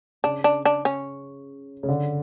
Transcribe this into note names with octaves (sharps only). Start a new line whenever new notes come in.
C#3 D4
D4
D4
C#4
C#3
D3